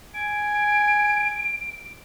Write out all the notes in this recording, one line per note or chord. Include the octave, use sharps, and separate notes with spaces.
G#5 D7